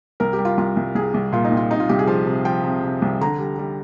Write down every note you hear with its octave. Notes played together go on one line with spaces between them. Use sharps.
C2 A#4
G4
G3
F4
C2 F4
C2
C2 G#4
C2
A#2 F4
D#4
C2
F4
C3 D#4
F4
C2 G4
G#4
F3 F5
C3
F3 G5
C3
C3
C2
D3 A#5
G3
G3